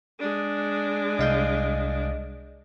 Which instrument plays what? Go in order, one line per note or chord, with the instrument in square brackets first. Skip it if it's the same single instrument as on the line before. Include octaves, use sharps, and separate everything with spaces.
[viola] G#3 D4
[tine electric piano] C2 F5 G6 [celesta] D#5